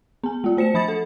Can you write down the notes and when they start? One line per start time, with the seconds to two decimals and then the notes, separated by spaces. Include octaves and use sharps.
0.24 B3 G#5
0.44 G#3 F4
0.57 A3 C5 C#7 E7
0.74 F3 B5 D#6 A6 C#7
0.88 A4